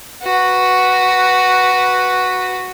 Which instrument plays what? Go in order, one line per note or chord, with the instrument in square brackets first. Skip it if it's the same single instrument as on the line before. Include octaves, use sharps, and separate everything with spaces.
[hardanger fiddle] F#4 B4